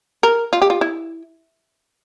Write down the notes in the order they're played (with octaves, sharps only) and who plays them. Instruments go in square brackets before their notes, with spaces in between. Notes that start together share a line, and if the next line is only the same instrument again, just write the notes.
[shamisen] A#4
F4
G4
F4
E4